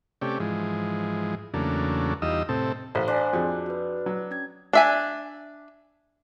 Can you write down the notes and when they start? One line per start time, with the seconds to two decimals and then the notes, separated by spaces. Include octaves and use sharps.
0.21 C3 A3 C#4 G4 D5
0.40 G#2 E3 F3 G#3
1.54 E2 C#3 F#3 A3 A#3 D4
2.22 E2 G3 D#4 F4 D#5 E6
2.49 A2 C3 C4 A4
2.95 A1 C5 F5
3.08 D4 G#5 C6
3.33 F2 F4 F#4 G#4
3.66 F#4 B4
4.06 F#3
4.31 C#4 G#6
4.73 D4 E5 G#5